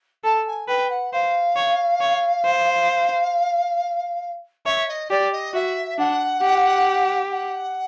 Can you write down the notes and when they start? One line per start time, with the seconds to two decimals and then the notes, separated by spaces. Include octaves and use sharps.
0.24 A4 A5
0.47 G#5
0.68 B4 G5
0.90 F#5
1.13 C5 F5
1.56 C#5
2.01 C#5
2.45 C5
4.66 C#5 E5
4.89 D#5
5.10 G4 D5
5.32 D#5
5.54 F#4 E5
5.98 D4 F#5
6.42 G4
7.31 F#5